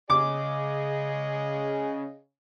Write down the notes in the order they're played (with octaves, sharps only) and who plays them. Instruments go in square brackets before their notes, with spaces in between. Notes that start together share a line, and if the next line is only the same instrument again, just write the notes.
[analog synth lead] C#3 [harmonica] G#4 D#5 [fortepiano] D6